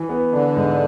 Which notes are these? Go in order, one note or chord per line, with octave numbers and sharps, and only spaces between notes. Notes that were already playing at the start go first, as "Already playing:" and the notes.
Already playing: E3
B3
D3 D4
G#2